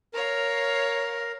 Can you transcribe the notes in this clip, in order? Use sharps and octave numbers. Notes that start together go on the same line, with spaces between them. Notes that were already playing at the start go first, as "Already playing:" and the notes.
A#4 C#5 F5